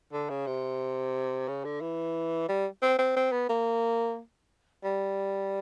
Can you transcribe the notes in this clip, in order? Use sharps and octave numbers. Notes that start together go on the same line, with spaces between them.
D3
C#3
C3
C#3
D3
E3
G3
C4
C4
C4
B3
A#3
G3